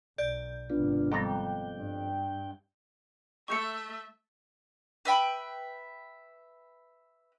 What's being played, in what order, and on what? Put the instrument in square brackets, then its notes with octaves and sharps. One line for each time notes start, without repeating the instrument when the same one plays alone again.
[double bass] B1 [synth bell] D5 G6
[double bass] G#1 C3 [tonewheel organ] B3 D4 F4
[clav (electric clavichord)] F2 A5 A#5 [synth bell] G3 B3 [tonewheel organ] G5
[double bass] G2
[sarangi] A3 [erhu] E5 [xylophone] C#6 G6 C#7
[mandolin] B4 E5 G5 B5